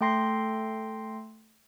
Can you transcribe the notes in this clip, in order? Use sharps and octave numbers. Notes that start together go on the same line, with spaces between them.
A3 A4 G5 C6 A#6 C7